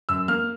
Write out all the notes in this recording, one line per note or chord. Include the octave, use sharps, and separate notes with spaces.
F#2 E6
A#3 F6